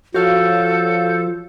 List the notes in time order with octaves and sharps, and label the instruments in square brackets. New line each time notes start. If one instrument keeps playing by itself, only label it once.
[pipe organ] F3 [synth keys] F#4 C#5 F5 [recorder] A4 [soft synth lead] G6